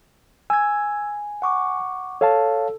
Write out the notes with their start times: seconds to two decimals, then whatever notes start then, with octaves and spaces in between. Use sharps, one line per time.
0.50 G#5 E6 G#6
1.42 F#5 C#6 D6
2.21 A4 C#5 F5 A5